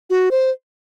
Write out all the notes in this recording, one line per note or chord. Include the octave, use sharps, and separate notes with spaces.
F#4
C5